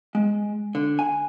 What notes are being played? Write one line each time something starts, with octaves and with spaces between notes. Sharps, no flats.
G#3
D3
G#5